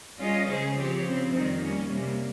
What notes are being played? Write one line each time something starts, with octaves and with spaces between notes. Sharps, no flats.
G3 C#4 F4 G#4 D#5
C#3 G#3 C#4 G#4 C5
F3 C4 G4 C#5
C#3 F3 C4
F2 D#3 G3 C4 D#4
G3 A#3 C#4
C3 G3 A#3